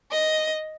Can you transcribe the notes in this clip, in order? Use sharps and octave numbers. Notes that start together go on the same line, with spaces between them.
D#5